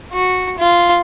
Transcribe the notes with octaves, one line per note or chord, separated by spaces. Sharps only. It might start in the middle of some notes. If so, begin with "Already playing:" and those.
F#4
F4